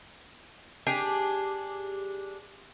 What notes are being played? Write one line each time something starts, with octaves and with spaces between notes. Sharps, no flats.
D4 G4 G#4